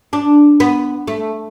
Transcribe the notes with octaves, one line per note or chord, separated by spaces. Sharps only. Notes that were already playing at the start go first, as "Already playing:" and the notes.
D4
B3
A3